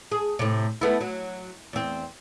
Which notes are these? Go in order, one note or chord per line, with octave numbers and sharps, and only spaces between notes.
G#4
A2 C3
A3 B3 E4
F#3
E2 C4